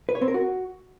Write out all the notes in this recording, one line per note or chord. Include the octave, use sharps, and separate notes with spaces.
B4
C#5
C4
A#4
F#4